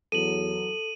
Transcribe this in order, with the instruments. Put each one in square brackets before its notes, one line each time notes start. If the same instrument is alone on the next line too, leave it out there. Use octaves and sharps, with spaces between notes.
[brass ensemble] E2 F#3 [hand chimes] A4 [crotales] D#7 F#7